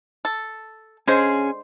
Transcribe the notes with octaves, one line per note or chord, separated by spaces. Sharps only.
A4
D3 G#3 C#4 G#4 C5